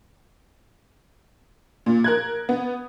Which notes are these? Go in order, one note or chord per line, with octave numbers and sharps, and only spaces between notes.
A#2
A#4 F#6 G#6
B3